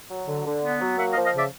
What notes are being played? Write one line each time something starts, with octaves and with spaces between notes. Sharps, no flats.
F#3
D3
D3
B3
F#3
A#3 E5 F#5
D#5 F5
F3
D#5 F5
C#3 D5 E5